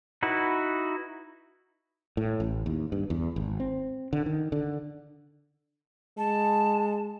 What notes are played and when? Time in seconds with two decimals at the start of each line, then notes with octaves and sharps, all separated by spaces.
0.23 D#4 E4 F#4 B4
2.17 A2
2.40 A1
2.66 D#2
2.92 G2
3.10 E2
3.36 G#1
3.60 C4
4.13 D3
4.26 D#3
4.52 D3
6.18 G#3 A5